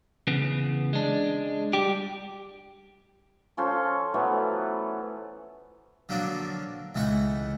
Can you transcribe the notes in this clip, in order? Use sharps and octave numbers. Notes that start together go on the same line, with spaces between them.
E2 C#3 B3
G#3 D4
G3 G4
F3 C#4 A4 C5
E3 F#3 A3 B3
D3 F3 F#3 A#3 D4
C#2 E3 A3 F#5 C#6